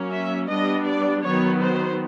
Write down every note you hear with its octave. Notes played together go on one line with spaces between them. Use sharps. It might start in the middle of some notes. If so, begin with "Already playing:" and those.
Already playing: F#3 A#3 C#4
E5
G3 B3 D4 D#5
D5
D#3 F#3 B3 C#5
C5